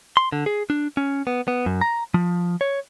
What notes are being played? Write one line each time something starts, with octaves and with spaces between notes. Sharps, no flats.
C6
D3
G#4
D4
C#4
B3
B3
F#2
A#5
F3
C#5